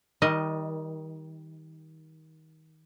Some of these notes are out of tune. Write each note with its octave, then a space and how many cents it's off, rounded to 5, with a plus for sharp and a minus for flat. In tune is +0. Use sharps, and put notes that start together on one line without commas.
D#3 +25 G3 +0 D#5 +0